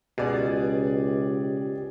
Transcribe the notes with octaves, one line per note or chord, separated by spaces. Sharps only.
C#2 B2 G4 G#4 D5